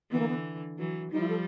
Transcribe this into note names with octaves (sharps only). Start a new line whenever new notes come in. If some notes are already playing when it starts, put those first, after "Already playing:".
D3 E3 B3
A#3
B3
E3 F#3
F3 G3 D#4
E4
A4